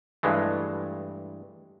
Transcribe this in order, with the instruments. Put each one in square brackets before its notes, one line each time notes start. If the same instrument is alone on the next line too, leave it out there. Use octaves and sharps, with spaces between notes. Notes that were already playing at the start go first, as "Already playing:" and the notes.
[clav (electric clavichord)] G2 E3 G#3 A3